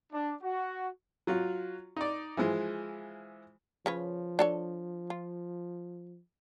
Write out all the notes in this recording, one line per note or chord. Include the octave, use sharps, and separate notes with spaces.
D4
F#4
F#3 F4 F#4
D#4 D5
E3 F3 G#3
C#3 F3 B4 C#5
D4 A4 C#5
F4